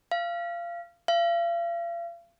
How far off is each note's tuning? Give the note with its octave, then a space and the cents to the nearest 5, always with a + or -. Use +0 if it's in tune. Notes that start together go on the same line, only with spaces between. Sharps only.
F5 -25
F5 -40